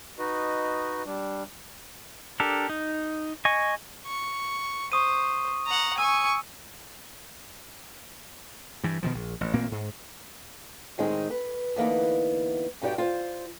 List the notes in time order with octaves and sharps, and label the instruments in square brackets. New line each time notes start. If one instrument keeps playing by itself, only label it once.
[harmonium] D#4 F#4 B4 D#5
G3 D4
[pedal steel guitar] D4 G4 A4 A#4
D#4
D#5 G#5 C#6
[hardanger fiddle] C#6
[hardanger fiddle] C5 [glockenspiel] C#6 D#6 D#7
[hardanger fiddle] F#5 A#5
[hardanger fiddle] G#5 C#6 [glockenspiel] E6 D#7
[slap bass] G2 E3
B2 D#3 F3
A#1
A1
A1 A#2 A#3 C4
G#2
[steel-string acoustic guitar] A2 D#3 G#3 C4 D#4
B4
D2 E3 A#3 B3 D#4
G2 D#4 F#4 G4 D5 G5
F4 C5